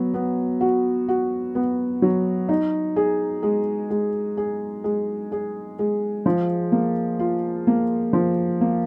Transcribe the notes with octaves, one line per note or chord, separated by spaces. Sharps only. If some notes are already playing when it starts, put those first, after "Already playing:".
Already playing: F#3 B3
B3
F#4
F#4
B3
F#3
D#4
G#4
G#3
G#3
G#4
G#3
G#4
G#3
F3
A#3
F4
A#3
F3
A#3